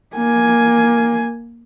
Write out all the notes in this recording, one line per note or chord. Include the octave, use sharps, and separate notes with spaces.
A#3 G#5